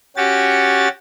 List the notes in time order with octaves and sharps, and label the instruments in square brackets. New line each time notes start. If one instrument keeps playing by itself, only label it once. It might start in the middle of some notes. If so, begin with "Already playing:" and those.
[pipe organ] C#4 F#4 G4 A6